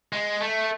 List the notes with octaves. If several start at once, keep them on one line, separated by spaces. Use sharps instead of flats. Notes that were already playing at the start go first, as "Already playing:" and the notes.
G#3
A3